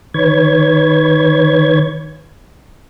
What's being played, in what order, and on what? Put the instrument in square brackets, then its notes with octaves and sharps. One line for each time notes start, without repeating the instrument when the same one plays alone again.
[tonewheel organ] D#3 B4 C#5 G#6